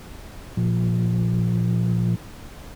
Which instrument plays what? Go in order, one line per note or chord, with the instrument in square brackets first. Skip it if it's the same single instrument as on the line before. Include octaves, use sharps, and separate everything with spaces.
[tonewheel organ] A#2 F3